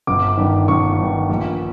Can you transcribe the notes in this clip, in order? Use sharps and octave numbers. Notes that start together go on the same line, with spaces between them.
G1 D6
G2 D#3
G1 C#6
G2 D#3
A#1